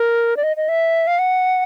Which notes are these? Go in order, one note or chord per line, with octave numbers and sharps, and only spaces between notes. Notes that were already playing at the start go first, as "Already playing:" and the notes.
Already playing: A#4
D5
D#5
D#5
E5
F5
F#5